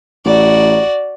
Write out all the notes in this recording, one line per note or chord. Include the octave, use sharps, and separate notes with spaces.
A1 F#4 D5